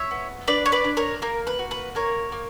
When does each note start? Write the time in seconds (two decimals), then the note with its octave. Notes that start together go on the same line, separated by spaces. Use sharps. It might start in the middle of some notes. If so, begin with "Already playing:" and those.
Already playing: C#5 E5
0.11 B3
0.48 D4 B4 D5
0.66 C#5
0.72 B4 D5
0.84 D4
0.97 A#4 C#5
1.22 A#3 A#4
1.47 B4
1.59 F#4
1.71 B4
1.95 A#3 A#4 C#5
2.32 A#3